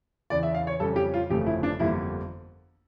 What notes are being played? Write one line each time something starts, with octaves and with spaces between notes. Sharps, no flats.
E2 C#3 E3 D5
E5
F5
C#5
F2 C#3 G3 C#4 A4
G4
F4
G1 F2 C#3 F3 A3 G4
E4
D4
G1 F2 D3 G3 A#3 E4